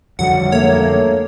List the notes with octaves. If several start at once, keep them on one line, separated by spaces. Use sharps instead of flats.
F2 D3 F#3 G3 F#5
G#2 A3 A#3 C#5